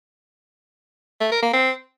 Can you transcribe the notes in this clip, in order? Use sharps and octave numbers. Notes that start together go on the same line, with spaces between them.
A3
A#4
A#3
C4